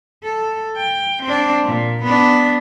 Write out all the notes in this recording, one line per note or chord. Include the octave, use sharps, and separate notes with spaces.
A4
G5
C4 D4
A#2
B3 D4